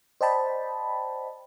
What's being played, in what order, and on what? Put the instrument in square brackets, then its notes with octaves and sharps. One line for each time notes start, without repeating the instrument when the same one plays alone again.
[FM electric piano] C5 D5 D#5 G5 A5 B5